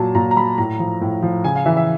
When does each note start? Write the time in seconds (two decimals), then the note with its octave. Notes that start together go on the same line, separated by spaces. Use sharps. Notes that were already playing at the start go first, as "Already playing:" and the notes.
Already playing: A#2 F#3 A5
0.15 A#2 A#5
0.31 A#5
0.37 F#3 B5
0.58 A2 A#5
0.79 F3
1.01 A2
1.22 F3
1.44 C#3 G#5
1.56 F5
1.66 E3 E5
1.77 E5